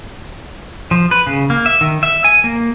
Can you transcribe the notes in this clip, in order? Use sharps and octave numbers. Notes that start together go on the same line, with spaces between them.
F3
B4
C#3
A#3
E5
D#3
E5
G#5
A#3